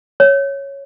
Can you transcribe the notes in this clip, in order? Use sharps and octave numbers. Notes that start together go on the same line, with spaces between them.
C#5